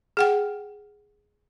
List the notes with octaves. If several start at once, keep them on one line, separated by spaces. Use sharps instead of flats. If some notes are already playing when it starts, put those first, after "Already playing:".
G#4 F#5 G5